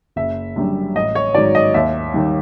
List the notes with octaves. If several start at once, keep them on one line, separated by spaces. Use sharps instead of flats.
F#1 E5
F#2 D3 G3
A1 D#5
C#5
G#2 D#3 F#3 D5
D#5
D#2 E5
D#3 G3